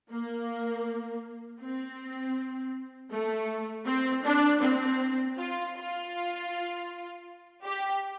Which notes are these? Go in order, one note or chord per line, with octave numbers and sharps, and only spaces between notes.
A#3
C4
A3
C4
D4
C4
F4
F4
G4